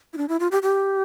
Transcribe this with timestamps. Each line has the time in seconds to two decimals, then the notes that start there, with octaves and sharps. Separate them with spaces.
0.13 E4
0.18 D4
0.29 E4
0.40 F4
0.51 G4
0.63 G4